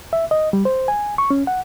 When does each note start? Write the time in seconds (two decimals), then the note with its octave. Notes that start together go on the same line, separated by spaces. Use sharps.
0.13 E5
0.31 D#5
0.53 G3
0.65 C5
0.88 G#5
1.18 C#6
1.30 C#4
1.47 F#5